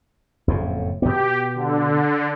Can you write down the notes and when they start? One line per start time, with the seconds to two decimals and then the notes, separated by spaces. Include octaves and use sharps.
0.48 F#1 F2 A2
1.02 B2 B3 G4
1.55 D3